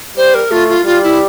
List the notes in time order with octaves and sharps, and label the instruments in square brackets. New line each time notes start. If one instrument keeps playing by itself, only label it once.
[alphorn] G3 [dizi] C5
[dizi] A#4
[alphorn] A3 [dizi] F4
[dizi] F4
[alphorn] G3 [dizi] F4
[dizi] E4